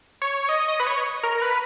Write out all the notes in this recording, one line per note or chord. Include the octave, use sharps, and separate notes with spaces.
C#5
D#5
D#5
B4
C#5
A#4
B4